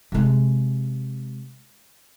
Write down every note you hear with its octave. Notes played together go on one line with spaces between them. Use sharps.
C3 G#3